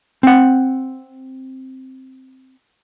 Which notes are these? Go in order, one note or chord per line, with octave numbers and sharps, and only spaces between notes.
C4 F#5